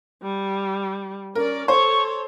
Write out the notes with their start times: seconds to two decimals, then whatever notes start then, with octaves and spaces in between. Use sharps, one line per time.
0.22 G3
1.35 C#4 A#4 D5
1.68 A4 C5 C#5 C#6